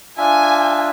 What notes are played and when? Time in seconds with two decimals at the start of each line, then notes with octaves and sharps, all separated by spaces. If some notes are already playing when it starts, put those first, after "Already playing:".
0.18 D4 F4 E5 G#5